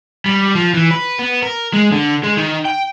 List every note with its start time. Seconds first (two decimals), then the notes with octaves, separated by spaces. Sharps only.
0.26 G3
0.55 F3
0.74 E3
0.91 B4
1.19 B3
1.43 A#4
1.73 G#3
1.92 D3
2.24 G#3
2.37 D#3
2.65 G5